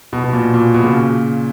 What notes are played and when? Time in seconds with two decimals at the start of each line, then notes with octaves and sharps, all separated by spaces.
0.13 B2
0.24 B2
0.33 A#2
0.54 A#2
0.74 B2
0.83 A#2 C#3